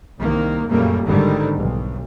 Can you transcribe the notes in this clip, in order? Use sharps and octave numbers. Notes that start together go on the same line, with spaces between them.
C2 D#3 A#3
F#2 A#2 C#3 G3 A3 A#3
G#1 G#2 D3 D#3 G3
B1